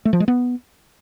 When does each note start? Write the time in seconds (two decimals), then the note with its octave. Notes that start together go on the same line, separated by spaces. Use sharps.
0.05 A3
0.13 F3
0.20 G#3
0.28 B3